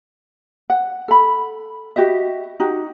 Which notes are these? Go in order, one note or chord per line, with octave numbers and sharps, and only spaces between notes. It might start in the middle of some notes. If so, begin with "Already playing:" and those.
F#5
A4 B5
F#4 G4 D#5 E5
D#4 F#4 G4